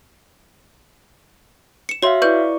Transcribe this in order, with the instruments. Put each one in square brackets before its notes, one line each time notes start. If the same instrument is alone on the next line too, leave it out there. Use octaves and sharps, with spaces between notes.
[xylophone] C#7 E7
[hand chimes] F#4 E5 F5 [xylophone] C#5 C6
[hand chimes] E4 D5 C#6 [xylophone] B4 G6